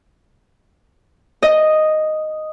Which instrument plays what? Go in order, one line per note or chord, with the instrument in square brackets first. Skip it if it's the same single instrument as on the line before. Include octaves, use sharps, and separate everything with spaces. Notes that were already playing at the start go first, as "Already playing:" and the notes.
[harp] D#5